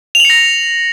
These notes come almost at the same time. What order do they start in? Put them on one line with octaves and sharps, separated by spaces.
F7 F#7 C#7 A#6